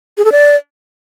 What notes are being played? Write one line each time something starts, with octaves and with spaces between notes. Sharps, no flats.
G#4
A4
D5